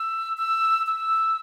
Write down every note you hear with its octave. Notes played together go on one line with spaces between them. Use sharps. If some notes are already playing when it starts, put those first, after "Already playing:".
Already playing: E6
E6
E6